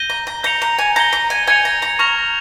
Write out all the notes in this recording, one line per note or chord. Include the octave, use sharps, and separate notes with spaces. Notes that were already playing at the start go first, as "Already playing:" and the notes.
Already playing: G6 A#6 D#7 G7
A#5
A#5
A#5 G6 C#7 F7
A#5
G#5
A#5 G6 C#7 G7
A#5
G#5
G#5 G#6 C#7 F7
A#5
A#5
A#5 C#6 F6 A#6 F7